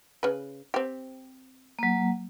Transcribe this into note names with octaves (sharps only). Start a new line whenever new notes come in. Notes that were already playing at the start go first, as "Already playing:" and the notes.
C#3 B4
C4 G4
F#3 A#3